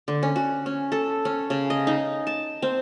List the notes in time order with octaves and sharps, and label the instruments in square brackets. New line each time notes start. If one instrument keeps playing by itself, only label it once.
[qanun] D3
C#4
F#4
C#4
A4
C#4
C#3
D#5
D#4
A5
C4